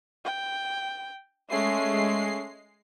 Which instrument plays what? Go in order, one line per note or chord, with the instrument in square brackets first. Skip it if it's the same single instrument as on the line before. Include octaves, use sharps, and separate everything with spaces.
[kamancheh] G5
[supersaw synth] G#3 C7 [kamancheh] A3 C#4